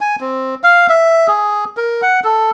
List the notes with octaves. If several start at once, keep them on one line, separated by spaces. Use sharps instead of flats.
G#5
C4
F5
E5
G#4
A#4
F#5
A4